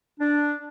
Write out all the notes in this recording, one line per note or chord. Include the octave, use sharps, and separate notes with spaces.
D4